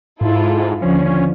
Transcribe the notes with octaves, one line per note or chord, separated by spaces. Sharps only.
G#2 E4 F4 A4
D#2 D3 F3 C#4